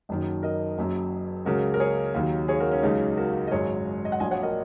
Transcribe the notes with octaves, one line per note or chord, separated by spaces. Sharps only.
F#1 F#2 D#3 F#3
A#4 D#5
F#1 F#2 F#3
C#2 C#3 F#3 F#4 A#4
A#4
G#4 C#5
D#2 D#3 F#3
G#4 C#5
F#4 A#4
C#4
C#2 C#3 F#3 D#4
F#4 A#4
D#5
G#1 F#2 F#3 G#4 C#5
D#5
F#5
A#1 A#2 F#3 D#5 G#5
C#5 F#5
A#4 D#5